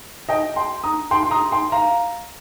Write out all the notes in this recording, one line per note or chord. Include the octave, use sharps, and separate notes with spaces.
D#5 G5
G5 C6
A#5 D#6
G5 C6
C6
A#5 D#6
G5 C6
F5 A#5